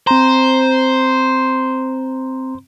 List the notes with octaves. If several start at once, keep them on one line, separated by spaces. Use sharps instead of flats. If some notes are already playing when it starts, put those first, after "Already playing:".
C4 C5 A#5